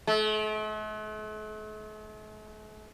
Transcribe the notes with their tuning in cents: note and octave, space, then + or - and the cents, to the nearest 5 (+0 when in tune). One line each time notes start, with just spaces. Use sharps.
A3 -45